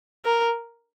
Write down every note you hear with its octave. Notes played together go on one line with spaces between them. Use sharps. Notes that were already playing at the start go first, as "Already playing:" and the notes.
A#4